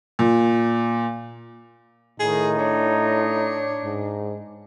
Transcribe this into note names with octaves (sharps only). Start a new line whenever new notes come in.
A#2
A2 D#3 D#4 G#4
D4 C#5
G#2